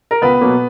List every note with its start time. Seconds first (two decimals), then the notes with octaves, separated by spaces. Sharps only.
0.11 A#4
0.22 C#2 B3 B4
0.41 B2 F#3 A#3